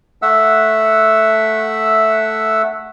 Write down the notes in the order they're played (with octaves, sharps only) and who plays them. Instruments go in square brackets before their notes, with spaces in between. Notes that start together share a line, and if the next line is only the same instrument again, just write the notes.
[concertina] A3 E5 F#5 E6